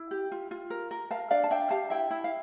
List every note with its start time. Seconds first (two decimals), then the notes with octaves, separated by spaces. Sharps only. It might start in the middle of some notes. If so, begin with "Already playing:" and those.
Already playing: E4
0.11 G4
0.32 F4
0.51 F4
0.70 A#4
0.91 A#4
1.10 A#4 F5 A5
1.31 D4 D5 F5
1.44 A5
1.50 D4 E5 G5
1.70 G4 F5 A5
1.90 E4 E5 G5
2.11 E4
2.24 F5